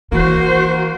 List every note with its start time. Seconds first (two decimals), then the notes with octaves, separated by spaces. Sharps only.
0.12 E3 A#3 F#4 C5